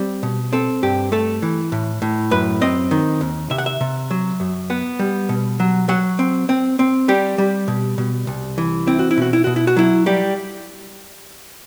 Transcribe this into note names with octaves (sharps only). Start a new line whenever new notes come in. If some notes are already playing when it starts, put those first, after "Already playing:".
Already playing: G3 C4
B2
C4 A4
G2 G4
A3 A4
E3
A2
A2
F#2 B4
C4 D#5
D#3
D#2
C3 E5
F#5
E5
C3
F#3
F#2
B3 F#5
G3
B2
F#3
F#3 F#5
C4
C4
C4
G3 G4
G3
B2
B2
C2
E3
C4 E4
F#4
E4
B2 F#4
E4
B2 F#4
E4
F#4
F#3 E4
G3 G4